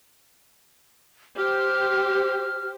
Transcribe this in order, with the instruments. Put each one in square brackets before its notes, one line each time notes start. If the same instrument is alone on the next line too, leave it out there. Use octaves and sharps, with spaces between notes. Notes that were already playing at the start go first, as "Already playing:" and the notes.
[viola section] G4 C5 [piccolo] F6